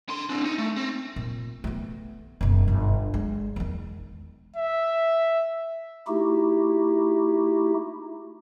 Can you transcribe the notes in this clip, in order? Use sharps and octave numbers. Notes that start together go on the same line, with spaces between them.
D3 C6
C4 D4
D#4
A3
C4
A#2
A3 B3
F#1 B2
G1
G#3
E2 D#3
E5
A3 D#4 E4 F#4 G4